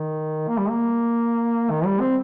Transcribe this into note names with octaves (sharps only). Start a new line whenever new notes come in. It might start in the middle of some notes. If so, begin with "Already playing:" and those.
Already playing: D#3
A#3
G3
A#3
D#3
G3
C4